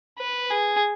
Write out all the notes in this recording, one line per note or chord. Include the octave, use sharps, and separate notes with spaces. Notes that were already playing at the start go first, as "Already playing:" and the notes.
B4
G#4